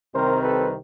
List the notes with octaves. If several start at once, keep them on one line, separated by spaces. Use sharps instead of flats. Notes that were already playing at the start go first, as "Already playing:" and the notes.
C2 C3 D#3 G3 C4 A#4 C5
A4 B4